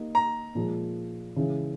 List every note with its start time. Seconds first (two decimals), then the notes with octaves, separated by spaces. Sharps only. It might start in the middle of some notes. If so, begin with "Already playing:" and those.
Already playing: A#3 D#4 G4 D#5
0.15 A#5
0.55 A#2 F3 G#3
1.36 C#3 E3 G#3